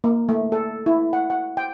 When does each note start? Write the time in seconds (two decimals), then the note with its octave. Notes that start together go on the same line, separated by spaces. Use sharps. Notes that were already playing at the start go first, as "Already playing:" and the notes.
0.04 A#3
0.29 A3
0.52 A4
0.86 E4
1.13 F#5
1.30 F#5
1.57 G5